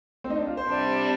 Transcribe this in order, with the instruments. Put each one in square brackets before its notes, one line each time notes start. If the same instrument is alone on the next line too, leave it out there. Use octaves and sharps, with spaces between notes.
[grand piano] C4
D#4
D4
F4
C5
[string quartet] C3 G3 D4